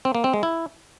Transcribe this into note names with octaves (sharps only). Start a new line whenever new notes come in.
C4
A#3
C4
G#3
E4